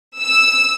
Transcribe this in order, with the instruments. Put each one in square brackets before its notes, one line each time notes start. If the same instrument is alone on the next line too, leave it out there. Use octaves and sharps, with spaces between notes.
[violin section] E6